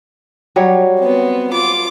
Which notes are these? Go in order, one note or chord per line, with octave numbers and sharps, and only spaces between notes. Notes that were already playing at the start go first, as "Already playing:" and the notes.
F#3 G3 C#5
B3 C4
F4 D6